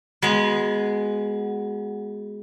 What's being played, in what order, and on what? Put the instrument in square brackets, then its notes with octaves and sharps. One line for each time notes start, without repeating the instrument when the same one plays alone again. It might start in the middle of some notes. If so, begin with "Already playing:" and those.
[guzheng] G#3 B3 [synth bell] F#4 F#5